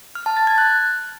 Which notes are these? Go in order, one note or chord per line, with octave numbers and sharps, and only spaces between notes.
F6
A5
A6
G#6
F#6